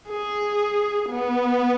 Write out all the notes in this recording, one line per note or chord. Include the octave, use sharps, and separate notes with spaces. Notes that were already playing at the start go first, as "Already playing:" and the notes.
G#4
B3